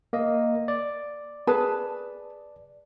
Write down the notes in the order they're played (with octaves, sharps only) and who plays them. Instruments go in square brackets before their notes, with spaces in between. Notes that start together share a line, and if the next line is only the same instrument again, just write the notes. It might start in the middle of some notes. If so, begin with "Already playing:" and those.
[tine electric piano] A#3 D#5
D5
[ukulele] G#4 B4 A5